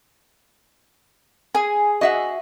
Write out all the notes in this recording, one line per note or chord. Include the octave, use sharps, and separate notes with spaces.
G#4 G#5
F#4 D#5 E5 F#5